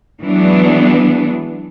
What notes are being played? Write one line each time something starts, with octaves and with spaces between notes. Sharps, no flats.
E3 F#3 G#3 B3 D4